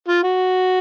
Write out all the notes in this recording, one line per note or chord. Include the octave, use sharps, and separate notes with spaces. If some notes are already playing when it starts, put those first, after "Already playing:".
F4
F#4